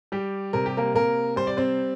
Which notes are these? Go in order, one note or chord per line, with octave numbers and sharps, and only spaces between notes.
G3 G4
C3 A#4
G4
A#3 A#4
C3 A#3 A#4
G3 C5
D5
C4 C5